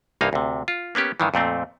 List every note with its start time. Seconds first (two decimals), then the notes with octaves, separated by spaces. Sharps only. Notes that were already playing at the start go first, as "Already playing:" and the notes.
0.21 C2 G2 A#3 D#4 F5
0.33 D2 C3
0.68 F4
0.95 A#3 B3 C#4 G4
1.20 G2 D#3 E3
1.34 F2 A#2 A3 C4